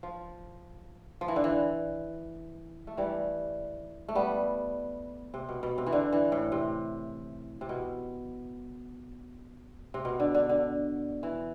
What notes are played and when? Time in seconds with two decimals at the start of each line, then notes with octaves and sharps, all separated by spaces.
0.03 F3
1.21 F3
1.28 E3
1.36 D3
1.44 E3
2.87 A3
2.97 E3 G3
4.08 A3
4.15 G3 B3
5.34 C3
5.49 B2
5.63 B2
5.78 C3
5.87 E3
5.93 D3
6.12 E3
6.32 A2
6.52 C3
7.61 C3
7.69 B2
9.94 C3
10.05 B2
10.20 D3
10.35 D3
10.49 D3
11.23 E3